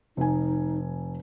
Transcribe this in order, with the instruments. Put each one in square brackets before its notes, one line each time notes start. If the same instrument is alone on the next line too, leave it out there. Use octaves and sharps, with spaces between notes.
[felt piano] F1 G#5 [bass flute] D#4